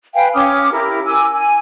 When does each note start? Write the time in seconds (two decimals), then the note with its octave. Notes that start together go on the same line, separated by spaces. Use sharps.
0.14 B4 F5 G5 G#5
0.34 C#4 D6 D#6 F6
0.72 E4 G4 A#4
1.06 G#5 D6 E6
1.35 G#5